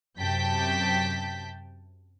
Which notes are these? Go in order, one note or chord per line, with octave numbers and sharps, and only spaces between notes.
F#2 C3 G5 A5 G6 B6